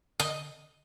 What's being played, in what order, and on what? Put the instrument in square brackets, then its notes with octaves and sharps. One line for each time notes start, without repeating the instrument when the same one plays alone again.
[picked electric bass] D3 [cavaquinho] D#5